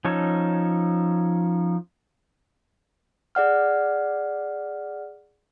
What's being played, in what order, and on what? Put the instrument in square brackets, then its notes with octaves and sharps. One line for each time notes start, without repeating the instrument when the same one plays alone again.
[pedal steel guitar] F3 C#4 D#4 A4 C#5
[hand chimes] G#4 D5 F#5 F6